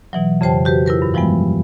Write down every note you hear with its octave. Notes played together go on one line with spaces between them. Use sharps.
B2 E3 F#3
F2 C#3 G4 C5 G5 A5
F#4 G4 B4 C5
E4 F4 A#4 B4
G2
E3 F3 G3 G#3 B3